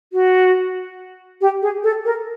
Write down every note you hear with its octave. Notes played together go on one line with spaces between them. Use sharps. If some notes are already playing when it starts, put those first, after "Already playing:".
F#4
G4
G#4
A4
A#4